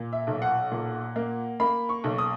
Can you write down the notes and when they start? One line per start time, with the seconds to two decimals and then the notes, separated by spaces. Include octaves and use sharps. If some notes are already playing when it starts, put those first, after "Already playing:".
Already playing: A#2
0.13 E5
0.27 B1
0.42 F#5
0.71 A#2
1.16 A#3
1.60 A#3 B5
1.89 C#6
2.04 B1
2.18 D#6